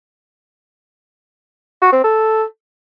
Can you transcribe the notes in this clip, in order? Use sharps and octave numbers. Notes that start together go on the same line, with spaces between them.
F#4
C4
A4